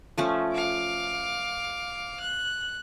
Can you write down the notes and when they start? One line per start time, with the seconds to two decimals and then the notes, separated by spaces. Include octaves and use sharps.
0.18 F3 A3 C#4
0.54 F5 D6
2.20 F#6